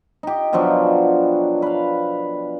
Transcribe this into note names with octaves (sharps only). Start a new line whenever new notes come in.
D#4 G4
B2 F3 F#3 D4
B4 F5